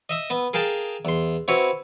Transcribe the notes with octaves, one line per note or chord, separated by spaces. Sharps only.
D#5 E5 D#6
B3
G#4 A#4 F5 G5 A5
E2 C6
C4 E4 F#4 B4 C#5